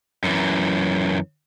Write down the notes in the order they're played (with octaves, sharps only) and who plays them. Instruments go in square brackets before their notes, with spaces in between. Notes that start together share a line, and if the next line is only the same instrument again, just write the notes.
[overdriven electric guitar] F#2 E3